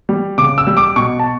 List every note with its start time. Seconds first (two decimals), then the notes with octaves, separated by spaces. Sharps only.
0.09 G3
0.38 C#3 D6
0.58 E6
0.67 G3
0.77 D6
0.96 B2 C#6
1.19 A5